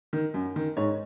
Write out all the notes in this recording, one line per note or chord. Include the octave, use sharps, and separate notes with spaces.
D#3
F#2
D#3
G#2 C#5